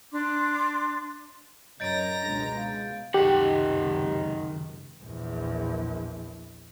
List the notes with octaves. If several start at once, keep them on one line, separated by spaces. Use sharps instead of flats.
D4 C6 D6
F#2 C#5 D#5 A#5 G6 A6 A#6 D7
C#2 B2 G#3 D4
F5
C#2 F#2 C3 D#3 G4 F#5
A#1 E2